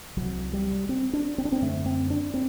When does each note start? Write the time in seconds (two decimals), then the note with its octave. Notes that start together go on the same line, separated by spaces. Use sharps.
0.17 C2 C3 F#3
0.53 G3
0.89 C4
1.13 D4
1.38 C4
1.45 D4
1.52 C4
1.61 F#2 D3 A3
1.86 C4
2.10 D4
2.34 C4